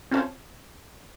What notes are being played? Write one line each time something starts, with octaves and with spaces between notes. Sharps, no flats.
C4 C#4 F4 A4 C5 C#5